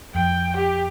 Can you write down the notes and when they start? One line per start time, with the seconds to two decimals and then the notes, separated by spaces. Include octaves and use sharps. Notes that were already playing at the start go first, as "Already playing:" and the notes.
0.15 F2 G5
0.56 G4